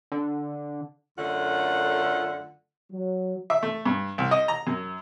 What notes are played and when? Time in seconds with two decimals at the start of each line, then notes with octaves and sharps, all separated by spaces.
0.12 D3
1.17 F#2 D3 A3 F4 F#5
2.91 F#3
3.50 E5
3.63 A3
3.86 G2
4.18 C2
4.31 D#5
4.48 A#5
4.67 F#2